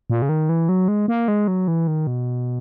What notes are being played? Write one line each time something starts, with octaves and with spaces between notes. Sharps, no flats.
A#2
C#3
D#3
E3
F#3
G#3
A#3
G#3
F#3
E3
D#3
B2